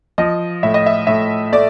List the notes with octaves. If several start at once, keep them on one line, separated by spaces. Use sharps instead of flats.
F3 D#5
A2 E5
D#5
E5
A2 E5
A3 D5